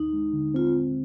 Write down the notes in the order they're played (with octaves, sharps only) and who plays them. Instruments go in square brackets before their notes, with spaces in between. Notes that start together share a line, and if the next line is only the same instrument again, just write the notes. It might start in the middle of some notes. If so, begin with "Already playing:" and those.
Already playing: [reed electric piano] D#2 [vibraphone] D#4
[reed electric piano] G#3
D3
[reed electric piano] C4 [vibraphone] F4